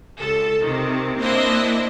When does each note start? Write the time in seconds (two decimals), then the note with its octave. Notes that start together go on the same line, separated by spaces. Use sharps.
0.18 C#2 A4
0.62 C3 D#3
1.19 A#3 C4 D4 E4 D#5 E5